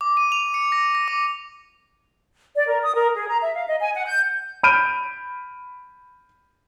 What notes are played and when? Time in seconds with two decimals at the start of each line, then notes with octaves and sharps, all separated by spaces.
0.01 D6
0.17 D#7
0.32 F7
0.54 C#7
0.72 A#6
0.95 A#6
1.08 D6
2.55 D5
2.67 A#4
2.82 D#6
2.95 A#4
3.15 G#4
3.28 A#5
3.41 E5
3.55 F5
3.67 D#5
3.79 G#5
3.94 F#5
4.06 G6
4.63 B5 F6 G6 D7 D#7